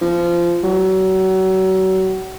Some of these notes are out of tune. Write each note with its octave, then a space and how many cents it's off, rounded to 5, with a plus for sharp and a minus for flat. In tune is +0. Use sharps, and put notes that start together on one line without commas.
F3 -20
F#3 +30